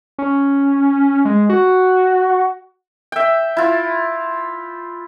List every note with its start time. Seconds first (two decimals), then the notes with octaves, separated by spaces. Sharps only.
0.18 C#4
1.25 G#3
1.49 F#4
3.12 E5 G5
3.57 E4 F4